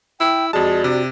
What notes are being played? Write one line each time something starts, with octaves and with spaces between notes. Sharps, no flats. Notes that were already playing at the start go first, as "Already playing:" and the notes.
E4 G5
F2 G#3 F#4 D5 A5
C3 D4